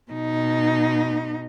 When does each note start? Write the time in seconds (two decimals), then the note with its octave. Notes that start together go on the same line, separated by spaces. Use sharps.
0.11 B2 D#4